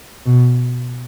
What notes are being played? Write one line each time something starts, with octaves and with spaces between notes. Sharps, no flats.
B2